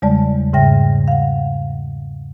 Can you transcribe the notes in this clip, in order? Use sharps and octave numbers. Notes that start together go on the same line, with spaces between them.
E2 C#3 G3 G#3 D5 A5
G#2 C#3 E5 G5 A#6
F5 F#5